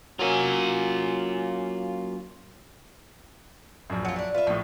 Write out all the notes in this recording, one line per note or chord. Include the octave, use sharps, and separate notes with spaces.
F#3 A#3 C#4 F4 G#5
A#1 F#2
F#3 F4
D4 E4
F4 B4 E5
A#1 A2 D#4